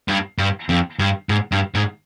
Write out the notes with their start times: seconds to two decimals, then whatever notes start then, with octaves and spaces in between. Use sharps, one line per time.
0.08 G2
0.39 G2
0.69 F2
0.99 G2
1.29 G#2
1.52 G2
1.75 G#2